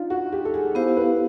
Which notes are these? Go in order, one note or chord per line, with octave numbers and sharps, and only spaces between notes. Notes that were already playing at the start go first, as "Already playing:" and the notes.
Already playing: D4 D#4 F4
F#4
G4
A4
G#4
B3 E4 G4 C5 F5
B4